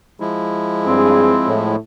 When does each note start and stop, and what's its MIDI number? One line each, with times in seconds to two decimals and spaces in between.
0.20 1.76 53
0.20 1.76 56
0.20 1.76 64
0.86 1.35 43
0.86 1.63 60
0.86 1.35 68
1.46 1.75 45